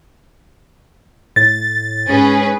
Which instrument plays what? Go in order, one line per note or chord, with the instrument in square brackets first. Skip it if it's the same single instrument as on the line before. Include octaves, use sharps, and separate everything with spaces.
[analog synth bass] A2 [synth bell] A6
[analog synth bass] G#2 [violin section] C#4 G#4 B4